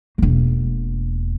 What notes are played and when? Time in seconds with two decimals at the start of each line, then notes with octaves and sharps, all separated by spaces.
0.18 E1 A#3